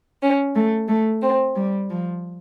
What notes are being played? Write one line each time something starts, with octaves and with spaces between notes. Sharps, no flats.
C#4
A3
A3
C4
G3
F3